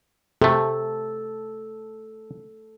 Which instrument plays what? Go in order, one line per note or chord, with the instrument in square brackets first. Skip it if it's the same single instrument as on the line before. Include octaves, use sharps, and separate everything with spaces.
[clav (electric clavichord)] C3 A3 [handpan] A4